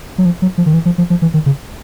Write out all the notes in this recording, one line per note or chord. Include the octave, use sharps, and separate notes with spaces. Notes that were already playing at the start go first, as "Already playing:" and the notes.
F#3
F3
F#3
F3
D#3
E3
F3
F3
F3
E3
D#3
C#3